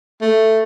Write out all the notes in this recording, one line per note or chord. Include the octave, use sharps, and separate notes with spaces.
A3